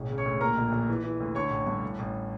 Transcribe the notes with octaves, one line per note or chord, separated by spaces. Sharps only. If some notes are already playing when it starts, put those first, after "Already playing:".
Already playing: E1 A1
C#3
C#5 C#6
D2
A#2 A#4 A#5
A#1
A#1
E3
E3
D2
D3 C#5 C#6
A1
G2
A1
A1